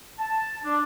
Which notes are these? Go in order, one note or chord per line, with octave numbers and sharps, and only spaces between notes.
A5
D4